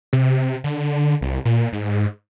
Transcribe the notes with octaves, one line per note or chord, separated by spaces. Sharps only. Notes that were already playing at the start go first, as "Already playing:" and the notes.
C3
D3
C2
A#2
G#2